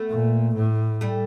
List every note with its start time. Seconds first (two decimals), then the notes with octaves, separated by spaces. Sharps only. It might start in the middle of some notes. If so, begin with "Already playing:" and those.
Already playing: A3 B3
0.09 A#2
0.55 A2
1.01 G3 A3